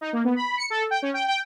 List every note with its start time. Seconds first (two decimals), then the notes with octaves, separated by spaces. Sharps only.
0.01 D#4
0.13 A#3
0.24 B3
0.36 B5
0.58 C#7
0.70 A4
0.91 G5
1.02 C#4
1.14 G5
1.28 G5